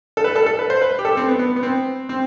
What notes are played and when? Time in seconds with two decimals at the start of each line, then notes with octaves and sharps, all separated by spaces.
0.17 A4
0.24 B4
0.36 A4
0.46 A4
0.59 B4
0.70 C5
0.82 B4
0.99 G4
1.05 A4
1.17 C4
1.28 B3
1.39 B3
1.56 B3
1.63 C4
2.09 C4